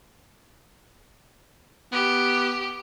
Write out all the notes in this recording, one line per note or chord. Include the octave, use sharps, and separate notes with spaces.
B3 G4